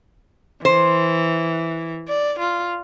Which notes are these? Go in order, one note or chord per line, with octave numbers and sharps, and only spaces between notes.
E3 C5
D5
F4